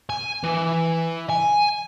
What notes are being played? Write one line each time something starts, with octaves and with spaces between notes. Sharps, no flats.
G#5
E3
G#5